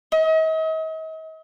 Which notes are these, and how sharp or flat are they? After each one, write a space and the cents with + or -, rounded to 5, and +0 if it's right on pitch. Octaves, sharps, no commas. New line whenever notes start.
D#5 +40